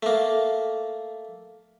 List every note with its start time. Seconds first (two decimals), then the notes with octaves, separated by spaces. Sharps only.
0.03 A3 A#3